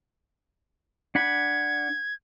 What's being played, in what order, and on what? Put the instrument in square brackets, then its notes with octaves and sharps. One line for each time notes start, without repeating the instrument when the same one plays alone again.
[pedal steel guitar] D4 F#5 B5 [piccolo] G#6